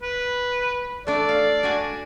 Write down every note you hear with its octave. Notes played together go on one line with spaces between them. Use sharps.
B4
A3 D4 D5
F5
D4 F#4 G#5